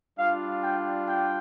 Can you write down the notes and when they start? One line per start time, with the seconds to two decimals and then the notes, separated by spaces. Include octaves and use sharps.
0.18 G3 D4 F4 F5
0.62 G5
1.07 G5